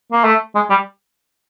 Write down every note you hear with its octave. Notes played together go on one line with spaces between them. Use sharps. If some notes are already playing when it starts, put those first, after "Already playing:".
A#3
A3
G#3
G3